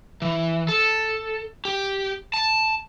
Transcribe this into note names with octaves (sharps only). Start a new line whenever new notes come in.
E3
A4
G4
A5